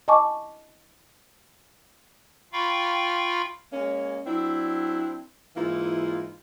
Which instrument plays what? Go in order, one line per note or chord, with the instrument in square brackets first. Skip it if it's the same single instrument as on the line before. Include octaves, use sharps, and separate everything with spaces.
[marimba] D#5 G#5 A5 C#6 D6
[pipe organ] F4 F5 G5 B5 C#6
[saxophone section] G#3 A#3 C#4
F#3 C4 D4 E4
G#2 E3 A#3 E4 F4